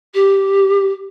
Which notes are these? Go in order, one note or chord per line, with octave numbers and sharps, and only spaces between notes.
G4